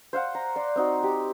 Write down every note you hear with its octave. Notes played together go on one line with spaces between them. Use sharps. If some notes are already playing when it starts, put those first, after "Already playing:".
C5 F5 F#5
A#5
D5 C6
C4 D#4 F#4
G4